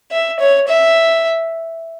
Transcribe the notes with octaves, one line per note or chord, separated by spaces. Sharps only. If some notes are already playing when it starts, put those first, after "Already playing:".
E5
C#5
E5